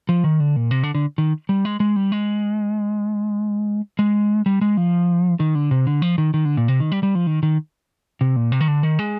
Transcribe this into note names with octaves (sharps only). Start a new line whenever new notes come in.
F3
D#3
D3
A#2
C3
D3
D3
D#3
G3
G#3
G#3
G3
G#3
G#3
G3
G#3
F3
D#3
D3
C3
D3
F3
D#3
D#3
D3
A#2
C3
D#3
G3
G3
F3
D#3
D#3
C3
A#2
C3
D#3
D3
D#3
G#3